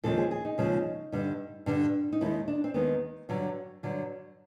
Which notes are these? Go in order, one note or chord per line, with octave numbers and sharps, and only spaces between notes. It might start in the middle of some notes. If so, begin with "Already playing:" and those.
D#2 C#3 F3 G#3 A4
G#4
G#4
D#4
D#2 C#3 F3 G#3
G2 D3 G3
G2 D3 G3 D4
D#4
D#2 D#3 G#3 E4
D4
C4
D#2 D#3 G#3 B3
G2 D3 F#3
G2 D3 F#3